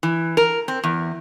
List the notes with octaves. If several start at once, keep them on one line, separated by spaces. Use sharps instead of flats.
E3
A#4
C4
E2